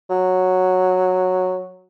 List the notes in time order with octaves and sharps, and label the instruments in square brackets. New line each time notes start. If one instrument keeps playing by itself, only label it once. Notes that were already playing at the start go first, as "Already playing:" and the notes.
[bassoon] F#3